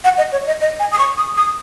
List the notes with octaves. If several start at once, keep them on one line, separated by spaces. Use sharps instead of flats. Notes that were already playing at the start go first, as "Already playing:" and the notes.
F#5
D#5
C#5
D#5
D#5
G#5
D#6
C#6
D#6
D#6